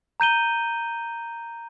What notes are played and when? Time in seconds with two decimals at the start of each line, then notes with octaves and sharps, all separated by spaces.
0.20 A#5 G6 D#7 G7